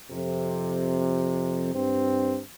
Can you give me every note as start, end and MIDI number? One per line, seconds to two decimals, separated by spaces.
0.10 1.71 41
0.10 1.71 48
1.74 2.40 43
1.74 2.40 60